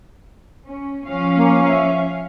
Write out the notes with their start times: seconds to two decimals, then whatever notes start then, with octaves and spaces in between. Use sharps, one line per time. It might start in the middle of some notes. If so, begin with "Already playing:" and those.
0.64 C#4
1.06 F3 C#4 F5
1.37 A#3
1.68 E5